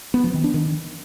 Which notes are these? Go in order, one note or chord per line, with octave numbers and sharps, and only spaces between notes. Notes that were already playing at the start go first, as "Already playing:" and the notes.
B3
F3
D#3
D4
D#3